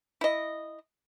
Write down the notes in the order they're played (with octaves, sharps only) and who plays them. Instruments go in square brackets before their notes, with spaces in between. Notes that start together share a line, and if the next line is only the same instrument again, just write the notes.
[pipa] E4 D#5